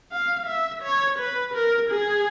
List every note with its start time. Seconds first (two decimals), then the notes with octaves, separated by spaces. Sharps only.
0.12 F5
0.47 E5
0.83 C#5
1.19 B4
1.54 A#4
1.90 G#4